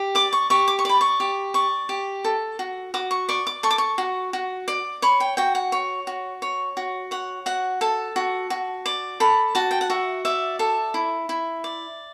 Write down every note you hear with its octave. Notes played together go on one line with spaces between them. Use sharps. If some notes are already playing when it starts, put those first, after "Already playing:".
Already playing: G4
D5 D6
C#6
G4 C#6
D6
C#6
D5 B5
C#6
G4
D5 C#6
G4
A4
F#4
F#4 D6
C#6
D5 C#6
D6
A4 C#6
D6
C#6
F#4
F#4
D5
C#5 B5
G5
F#4 G5
F#5
C#5
F#4
C#5
F#4
C#5 F#5
F#4 F#5
A4 A5
F#4
F#4
D5
A4 B5
F#4 A5
G5
F#5
F#4 E5
D5 E5
A4 E5
E4
E4
D5